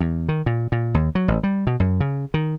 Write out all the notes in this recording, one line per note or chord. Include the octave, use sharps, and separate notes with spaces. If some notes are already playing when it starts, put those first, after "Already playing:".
E2
D#3
A#2
A#2
D#2
F#3
A1
G3
B2
F#2
C#3
D#3